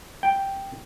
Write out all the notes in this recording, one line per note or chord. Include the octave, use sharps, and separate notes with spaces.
G5